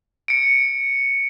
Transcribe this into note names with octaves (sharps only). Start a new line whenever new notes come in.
C#7 D7